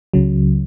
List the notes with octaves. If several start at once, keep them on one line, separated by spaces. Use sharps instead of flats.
C#2 C#3 F#3